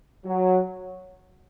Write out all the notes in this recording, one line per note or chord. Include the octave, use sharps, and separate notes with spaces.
F#3